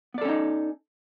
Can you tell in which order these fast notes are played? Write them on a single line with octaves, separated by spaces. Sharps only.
B3 D5 A4 C#4 D#4